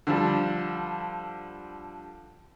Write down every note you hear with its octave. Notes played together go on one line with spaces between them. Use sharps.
D3 F3 G3